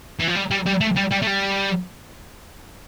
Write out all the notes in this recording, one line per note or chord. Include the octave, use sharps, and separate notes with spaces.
E3
F3
G3
G3
G3
A3
G3
G3
A3
G3